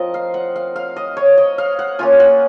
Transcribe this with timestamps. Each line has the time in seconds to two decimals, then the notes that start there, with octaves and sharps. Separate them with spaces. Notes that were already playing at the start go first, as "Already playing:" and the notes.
Already playing: F3 C4 F4 A#4 D#5
0.14 F5
0.34 F#5
0.56 F5
0.76 F5
0.96 D#5
1.17 C#5
1.38 D#5
1.58 F5
1.79 F#5
1.99 A#3 C#4 F4 G#5
2.20 F#5